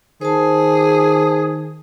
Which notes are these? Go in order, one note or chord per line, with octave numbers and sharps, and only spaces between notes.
D#3 G#4 C5 A5